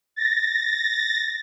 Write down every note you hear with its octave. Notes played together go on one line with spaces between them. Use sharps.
A6 A#6